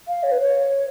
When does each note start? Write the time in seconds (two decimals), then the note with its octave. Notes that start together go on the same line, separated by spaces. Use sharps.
0.08 F5
0.23 C#5
0.32 B4
0.40 C#5